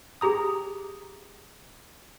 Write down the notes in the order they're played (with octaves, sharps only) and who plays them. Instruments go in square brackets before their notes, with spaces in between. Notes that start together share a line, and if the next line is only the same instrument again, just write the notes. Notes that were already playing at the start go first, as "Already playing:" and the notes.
[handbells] G4 G#4 A#5 D#6